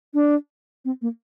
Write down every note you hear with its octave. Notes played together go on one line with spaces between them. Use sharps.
D4
C4
A#3